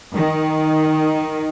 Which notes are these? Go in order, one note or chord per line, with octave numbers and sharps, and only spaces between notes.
D#3